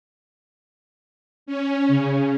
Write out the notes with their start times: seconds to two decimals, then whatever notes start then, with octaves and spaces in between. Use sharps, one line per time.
1.46 C#4
1.88 C#3